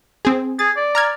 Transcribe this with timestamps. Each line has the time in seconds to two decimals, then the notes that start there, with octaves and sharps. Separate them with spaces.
0.25 C4 G#4
0.59 G#4 A6
0.77 D5
0.95 A#5 F6 G#6